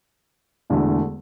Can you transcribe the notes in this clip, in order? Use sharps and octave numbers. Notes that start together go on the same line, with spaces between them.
E1 E2 D3 A3